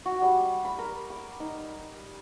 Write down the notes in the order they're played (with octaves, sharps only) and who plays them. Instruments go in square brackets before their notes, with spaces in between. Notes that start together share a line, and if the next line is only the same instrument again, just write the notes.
[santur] F#4
G3
B5
A#4
D6
D#4